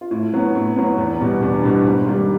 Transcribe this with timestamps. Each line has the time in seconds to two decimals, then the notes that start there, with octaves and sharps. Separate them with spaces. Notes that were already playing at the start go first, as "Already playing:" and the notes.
0.01 F4
0.11 A2 E4
0.33 F#3 B3
0.55 A2
0.76 F#3 B3
0.98 E2
1.20 B2 G3 B3
1.42 E2 D4
1.63 B2 G3 B3
1.86 G#2
2.07 D#3 G3 A#3